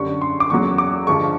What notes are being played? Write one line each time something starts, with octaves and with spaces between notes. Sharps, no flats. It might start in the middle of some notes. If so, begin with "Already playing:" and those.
Already playing: F#2 D3 G3 C#6
C6
D6
E2 C#3 F#3 C#6
D6
G2 D3 F3 G#3 C#6